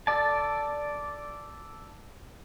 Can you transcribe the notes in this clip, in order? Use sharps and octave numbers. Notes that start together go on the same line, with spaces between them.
A4 D5 A5